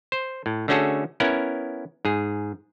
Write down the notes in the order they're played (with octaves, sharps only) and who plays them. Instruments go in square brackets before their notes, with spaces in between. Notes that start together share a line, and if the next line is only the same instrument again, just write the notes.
[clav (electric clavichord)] C5
A2
D3 A3 C#4 F#4 G#4 A4
B3 C#4 E4 A#4
G#2 G#4